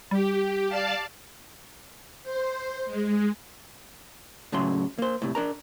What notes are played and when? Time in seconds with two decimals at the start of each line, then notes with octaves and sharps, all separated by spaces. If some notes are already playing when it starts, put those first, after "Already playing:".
0.11 G3 G4
0.69 D5 F5 A5
2.24 C5
2.86 G#3
4.52 A2 C#3 F#3 C6
4.98 A#3 C5
5.22 A2 C3
5.35 D4 A#4 A#5